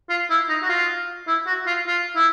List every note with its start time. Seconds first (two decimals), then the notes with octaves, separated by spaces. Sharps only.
0.10 F4
0.30 E4
0.49 D#4
0.63 F#4
0.69 F4
1.27 E4
1.47 F#4
1.67 F4
1.87 F4
2.16 E4